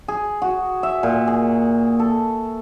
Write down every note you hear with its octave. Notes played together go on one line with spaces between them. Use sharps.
G#4
F#4
E5
A#2
G#4
A4